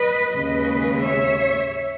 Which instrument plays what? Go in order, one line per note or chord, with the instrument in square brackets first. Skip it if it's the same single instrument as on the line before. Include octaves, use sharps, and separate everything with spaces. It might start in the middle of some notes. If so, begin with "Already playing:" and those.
Already playing: [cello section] B4 D#5
D#2 C#3 G#3 B4 D#5
C#5 E5